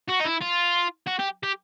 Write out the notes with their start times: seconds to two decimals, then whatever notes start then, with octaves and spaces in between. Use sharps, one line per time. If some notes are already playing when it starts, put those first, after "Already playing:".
0.08 F#4
0.20 D#4
0.24 E4
0.41 F4
1.07 F#4
1.19 G4
1.43 G4